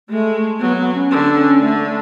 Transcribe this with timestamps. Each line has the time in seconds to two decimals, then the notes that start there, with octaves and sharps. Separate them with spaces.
0.09 G#3 A3
0.60 F#3 B3
0.77 B3
0.94 C#4
1.11 D3
1.26 D4
1.37 C#4
1.62 D3 A3
1.79 A3